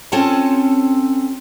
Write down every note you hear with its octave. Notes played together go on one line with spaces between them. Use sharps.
C4 C#4 F4 A4 G#5 A5